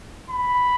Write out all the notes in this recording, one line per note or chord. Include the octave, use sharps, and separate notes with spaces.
B5